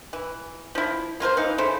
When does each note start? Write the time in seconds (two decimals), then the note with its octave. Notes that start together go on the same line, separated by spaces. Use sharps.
0.13 E3
0.75 F3 E4
1.20 A#3 F4 A#4 C5
1.37 E3 D#4 F5
1.58 C#3 E4 A4 C5